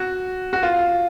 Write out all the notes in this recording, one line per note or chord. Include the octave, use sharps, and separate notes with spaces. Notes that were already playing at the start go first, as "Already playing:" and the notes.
Already playing: F#4
F#4
F4